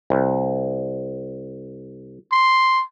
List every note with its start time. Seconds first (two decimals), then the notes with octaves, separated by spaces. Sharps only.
0.10 C2
2.32 C6